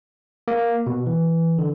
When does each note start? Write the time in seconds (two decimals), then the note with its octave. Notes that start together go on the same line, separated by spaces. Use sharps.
0.48 A#3
0.87 B2
1.07 E3
1.58 D3